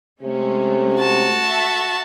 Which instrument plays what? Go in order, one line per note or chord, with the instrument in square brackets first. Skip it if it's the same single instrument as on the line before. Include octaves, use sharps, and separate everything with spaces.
[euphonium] C3 [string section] G#3 A3 C#4
[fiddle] F#4 A5
[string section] A4 E5